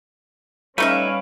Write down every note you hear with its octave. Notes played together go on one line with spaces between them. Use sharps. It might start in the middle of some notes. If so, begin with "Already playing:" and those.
G3 A3 C#4 D#4 B4 C#5 E5 F5